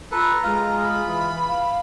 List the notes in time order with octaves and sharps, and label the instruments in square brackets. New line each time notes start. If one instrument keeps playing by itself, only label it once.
[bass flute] F4 [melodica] A4 B4 [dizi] A#5
[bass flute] G#3 [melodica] F4
[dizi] B5
[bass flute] E3
F5